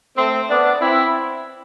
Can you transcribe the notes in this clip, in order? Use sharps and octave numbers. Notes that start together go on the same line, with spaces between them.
A3 C4
B3 D4
C4 E4